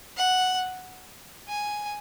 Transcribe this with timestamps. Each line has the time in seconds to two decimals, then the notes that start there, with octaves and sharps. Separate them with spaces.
0.17 F#5
1.48 G#5